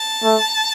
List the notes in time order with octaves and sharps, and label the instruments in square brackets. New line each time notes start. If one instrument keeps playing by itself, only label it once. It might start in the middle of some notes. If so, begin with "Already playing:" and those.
Already playing: [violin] A5
[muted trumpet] A3